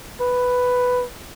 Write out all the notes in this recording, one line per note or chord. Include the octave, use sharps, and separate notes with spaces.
B4